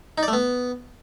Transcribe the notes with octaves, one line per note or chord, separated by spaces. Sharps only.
D#4
D5
A3
B3